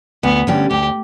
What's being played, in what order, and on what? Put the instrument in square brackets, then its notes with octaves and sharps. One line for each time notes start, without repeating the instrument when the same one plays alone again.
[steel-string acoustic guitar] D2 [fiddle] B3
[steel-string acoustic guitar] D3 G3 C#4 G4
[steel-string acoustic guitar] D2 [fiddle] G4